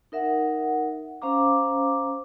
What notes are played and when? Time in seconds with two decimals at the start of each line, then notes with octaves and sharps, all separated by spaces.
0.12 D#4 A#4 E5 F#5
1.22 C#4 C5 F5 A#5 D6